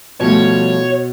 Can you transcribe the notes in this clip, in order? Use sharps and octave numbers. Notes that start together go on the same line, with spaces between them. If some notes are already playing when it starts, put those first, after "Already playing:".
B2 F3 G3 A3 C#5